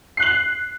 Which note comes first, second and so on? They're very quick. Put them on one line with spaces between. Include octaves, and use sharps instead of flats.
C7 F#6 F#7